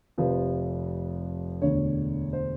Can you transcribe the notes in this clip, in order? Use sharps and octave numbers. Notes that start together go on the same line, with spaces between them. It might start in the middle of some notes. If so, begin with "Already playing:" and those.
F1 F2 C3 F3 B4
E1 D2 D3 C#5
C5